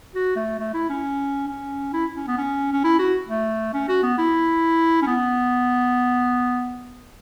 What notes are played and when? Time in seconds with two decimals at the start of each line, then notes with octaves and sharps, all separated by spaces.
0.15 F#4
0.36 A3
0.59 A3
0.74 E4
0.89 C#4
1.48 C#4
1.93 E4
2.16 C#4
2.28 B3
2.38 C#4
2.73 C#4
2.84 E4
2.99 F#4
3.29 A3
3.74 C#4
3.88 F#4
4.03 B3
4.18 E4
5.02 C#4
5.07 B3